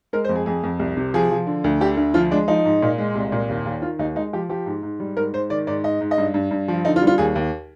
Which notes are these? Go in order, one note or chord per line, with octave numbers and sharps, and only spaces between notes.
G#3 A#4
C5
F2
G#4
F2 G#4
F2
C2
C3
F3 G#4
F3
D3
D2
D3 G4
D2
F3 F4
G#3 D4
F3 D#4
G#2
A#2
G#3
C2
A#2
D#2
D#2
D#3 F4
D#2 D#4
G#3 D#4
F3 G4
F3 G4
G#2
G#2
G3
G#2 A#4
G#2 C5
D#3 D5
G#2 D5
G#2 D#5
G#2
D#5
G2
G2
G2
F3
D3 D#4
F4
G3
F4
D#2 G#4
D#2